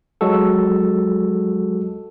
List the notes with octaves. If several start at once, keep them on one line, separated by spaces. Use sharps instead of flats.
F#3 G#3 F#4 A4